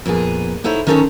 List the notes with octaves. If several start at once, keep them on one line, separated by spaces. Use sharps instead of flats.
F2 A#2 B3 G#4
B3 D#4 E4 A4 C5 C#5
D#3 C#4 D#4 A4 C5 C#5